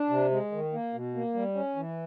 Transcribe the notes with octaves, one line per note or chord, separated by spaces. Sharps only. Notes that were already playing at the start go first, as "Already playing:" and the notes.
Already playing: D4
C3
G#3
D#3
A#3
B2
A#3
G3
C#4
E3